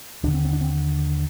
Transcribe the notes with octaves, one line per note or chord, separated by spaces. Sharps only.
D#2 D3 D4
C4
C4
D4
C4